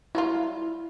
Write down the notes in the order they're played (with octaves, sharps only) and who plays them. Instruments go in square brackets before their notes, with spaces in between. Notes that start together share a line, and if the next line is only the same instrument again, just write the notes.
[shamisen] F#3 G3 F4 [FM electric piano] E4